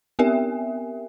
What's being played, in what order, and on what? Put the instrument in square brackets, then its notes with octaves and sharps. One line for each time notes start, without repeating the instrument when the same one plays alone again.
[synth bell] B3 C4 G4 A#4 E5 G#5